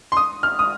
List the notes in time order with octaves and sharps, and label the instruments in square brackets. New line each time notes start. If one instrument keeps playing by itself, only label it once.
[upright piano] C6
D#6
F6
D#6